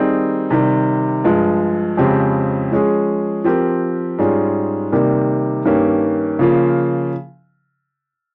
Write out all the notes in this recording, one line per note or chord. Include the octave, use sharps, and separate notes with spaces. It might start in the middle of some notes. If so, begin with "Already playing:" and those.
Already playing: D#3 G3 C4 D#4 G#4
C3 D#3 G3
G2 F3 G#3
F2 C#3 G#3 C4 G4
F3 G#3 C#4 G#4
F3 C4 G4 A#4
G#2 G3 C#4 F4 G#4
C3 D#3 G3 A#3
G2 D#3 A#3 C#4 G4
C#3 F3 A#3 F4